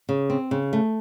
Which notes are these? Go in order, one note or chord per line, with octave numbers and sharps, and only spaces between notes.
C#3
C4
C#3
A3